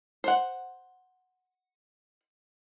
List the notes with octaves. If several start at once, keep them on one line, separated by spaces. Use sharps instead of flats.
C5 F#5